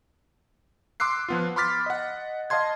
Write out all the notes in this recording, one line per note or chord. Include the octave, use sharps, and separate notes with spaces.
C6 D6 E6 F#6 C7
F3 B3 F4
B5 C6 D6 F6 A6 B6
D#5 F#5
D#5 F5 A5 C6 G#6